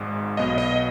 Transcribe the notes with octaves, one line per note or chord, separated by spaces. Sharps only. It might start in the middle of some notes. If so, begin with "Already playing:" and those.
Already playing: G#1 G#2 G#3
B1 B2 B3 D#5
D#5